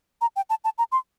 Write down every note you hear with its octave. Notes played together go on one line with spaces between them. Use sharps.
A#5
G5
A5
A5
A#5
C6